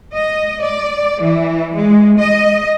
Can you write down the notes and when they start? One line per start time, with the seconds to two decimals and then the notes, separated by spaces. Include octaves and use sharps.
0.13 D#5
0.62 D5
1.21 E3
1.75 G#3
2.18 D#5